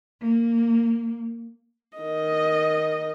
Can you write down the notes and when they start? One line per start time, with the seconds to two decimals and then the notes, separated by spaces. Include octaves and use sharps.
0.22 A#3
1.97 D#3 D#5